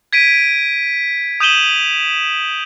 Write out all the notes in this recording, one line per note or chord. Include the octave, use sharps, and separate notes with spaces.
G#6 B6 D7 D#7
D#6 G6 D#7 E7 F#7 G7